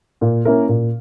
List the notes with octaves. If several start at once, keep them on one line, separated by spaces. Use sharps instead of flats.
A#2
A#3 C#4 E4 A#4
A#2